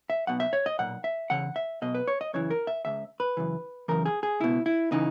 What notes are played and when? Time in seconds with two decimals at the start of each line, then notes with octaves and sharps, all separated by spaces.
0.10 E5
0.27 B1 B2 F#5
0.40 E5
0.53 C#5
0.66 D#5
0.79 B1 A#2 F#5
1.04 E5
1.30 E2 C#3 F#5
1.56 E5
1.82 B1 B2 D#5
1.95 B4
2.08 C#5
2.21 D#5
2.34 F#2 C#3 E3 C#5
2.50 A#4
2.67 E5
2.85 C#2 C#3 E5
3.20 B4
3.37 F#2 C#3 E3
3.88 F#2 C#3 E3 A#4
4.06 G#4
4.23 G#4
4.40 C#2 B2 E4
4.66 E4
4.92 C#3 E3 D#4